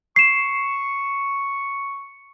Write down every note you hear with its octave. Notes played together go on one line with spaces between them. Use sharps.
C#6 C7 E7